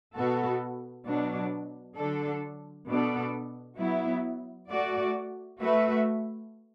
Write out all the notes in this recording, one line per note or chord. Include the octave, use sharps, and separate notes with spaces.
B2 B3 F#4 A4
B2 F#3 D4
D3 F#3 D4 A4
B2 B3 D4 A4 D5
F#3 B3 E4
A3 F#4 D5
A3 F#4 B4 E5